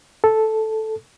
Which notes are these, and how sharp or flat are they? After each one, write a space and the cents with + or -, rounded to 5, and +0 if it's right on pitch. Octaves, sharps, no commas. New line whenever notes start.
A4 -5